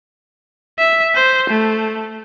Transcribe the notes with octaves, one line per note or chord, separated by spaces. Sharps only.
E5
C5
A3